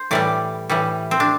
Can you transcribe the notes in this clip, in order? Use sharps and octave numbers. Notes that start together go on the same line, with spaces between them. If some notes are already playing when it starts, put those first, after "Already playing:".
Already playing: C5
A2 E3 G3 D5
A2 E3 G3
C4
D4